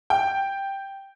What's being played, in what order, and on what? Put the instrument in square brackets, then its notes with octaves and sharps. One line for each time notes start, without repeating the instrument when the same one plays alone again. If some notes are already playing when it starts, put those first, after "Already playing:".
[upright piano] G5